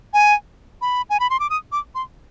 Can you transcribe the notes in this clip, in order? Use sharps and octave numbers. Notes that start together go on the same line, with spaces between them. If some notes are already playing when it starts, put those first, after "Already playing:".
G#5
B5
G#5
B5
C6
D6
D#6
D6
C6